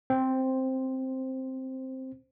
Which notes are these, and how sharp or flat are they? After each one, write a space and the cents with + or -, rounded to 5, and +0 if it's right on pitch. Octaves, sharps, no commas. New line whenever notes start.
C4 +0 C5 +5